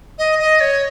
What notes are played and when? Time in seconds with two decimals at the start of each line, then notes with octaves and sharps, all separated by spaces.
0.19 D#5
0.39 D#5
0.60 C#5